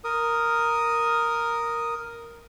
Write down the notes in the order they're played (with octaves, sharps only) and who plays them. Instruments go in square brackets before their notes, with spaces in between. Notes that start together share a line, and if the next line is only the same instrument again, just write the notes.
[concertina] A#4 D#6